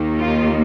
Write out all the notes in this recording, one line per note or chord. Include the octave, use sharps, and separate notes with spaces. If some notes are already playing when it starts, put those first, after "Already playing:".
Already playing: D#2 D#3 A#3
F4